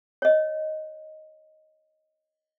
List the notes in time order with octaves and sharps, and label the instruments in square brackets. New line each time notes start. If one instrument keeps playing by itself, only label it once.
[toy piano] C#5 D#5